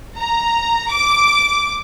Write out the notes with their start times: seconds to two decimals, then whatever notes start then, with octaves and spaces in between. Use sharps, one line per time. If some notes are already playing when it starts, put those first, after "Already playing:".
0.19 A#5
0.90 D6